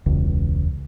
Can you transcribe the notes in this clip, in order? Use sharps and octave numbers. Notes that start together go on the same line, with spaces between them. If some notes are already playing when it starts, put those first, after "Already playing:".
E1 C#2